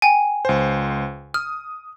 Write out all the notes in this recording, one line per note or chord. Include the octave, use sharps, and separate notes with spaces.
G5 G#5
C#2 C5
D#6 F6